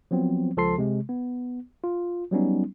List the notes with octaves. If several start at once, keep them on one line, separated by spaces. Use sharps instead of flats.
F3 F#3 B3 C4
C#2 F3 A4 A5 C6 C7
C3 G#3
B3
F4
F#3 G3 B3 C#4 D#4